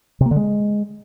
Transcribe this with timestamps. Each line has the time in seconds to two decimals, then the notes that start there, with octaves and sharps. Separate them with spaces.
0.21 C3
0.26 A#3
0.31 D3
0.36 G#3